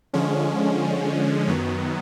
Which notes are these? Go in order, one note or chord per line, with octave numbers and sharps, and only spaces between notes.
D3 F3 G#3 C#4
F#2 D#3 F#3 B3